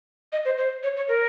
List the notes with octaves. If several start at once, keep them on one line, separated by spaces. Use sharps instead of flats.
D#5
C5
C5
C#5
C#5
A#4